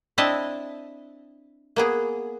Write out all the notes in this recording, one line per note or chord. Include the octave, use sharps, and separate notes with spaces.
C4 D4 E4 D#5 E5 A5
A#3 B3 G#4